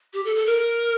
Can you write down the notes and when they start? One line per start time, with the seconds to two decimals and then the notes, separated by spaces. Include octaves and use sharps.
0.13 G4
0.25 A4
0.36 A4
0.47 A#4